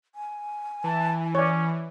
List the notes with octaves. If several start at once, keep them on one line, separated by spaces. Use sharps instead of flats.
G#5
E3 A5
C#4 C#5 D5